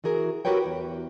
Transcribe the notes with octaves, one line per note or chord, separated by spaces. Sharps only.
E3 F#4 G#4 A#4
F#4 G4 A#4 B4 C#5 G5
E2